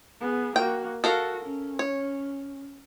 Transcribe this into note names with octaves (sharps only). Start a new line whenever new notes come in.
B3 G#4
A#3 F#4 G5
F#4 A4 A#4 F5
C#4
C#5